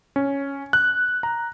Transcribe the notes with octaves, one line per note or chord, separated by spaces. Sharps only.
C#4
F#6
A#5